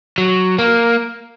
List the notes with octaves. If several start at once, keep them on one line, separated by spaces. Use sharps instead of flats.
F#3
A#3